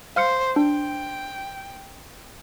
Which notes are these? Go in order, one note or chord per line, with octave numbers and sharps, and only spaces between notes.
C5 F5 F6 C#7
D4 G5